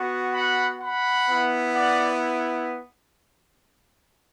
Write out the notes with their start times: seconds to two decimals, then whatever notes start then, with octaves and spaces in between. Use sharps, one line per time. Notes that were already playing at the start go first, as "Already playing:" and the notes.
Already playing: B3 F#4
0.33 F#5 B5
0.81 F#5 B5
1.28 B3 E4
1.75 D5 F#5